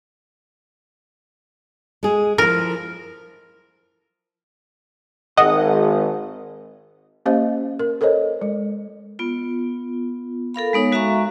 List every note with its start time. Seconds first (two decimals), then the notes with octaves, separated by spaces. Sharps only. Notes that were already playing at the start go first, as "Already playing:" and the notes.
2.03 G#3 G#4
2.38 F3 E4 A#4
5.37 G#1 D#5 F#5 D#6
7.26 A#3 C#4 G4 C5 D#5 F5
7.79 A#4
8.01 A4 A#4 C5 C#5 D#5
8.42 G#3
9.19 B3 F4
10.54 A4 A#4 F5 B5
10.73 G#3 B3 D#4 C#5
10.92 G#3 F#4 E5 F5 A#5 C#6